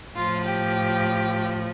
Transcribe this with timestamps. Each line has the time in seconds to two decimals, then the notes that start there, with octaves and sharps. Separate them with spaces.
0.15 A2 F3 F4
0.44 G4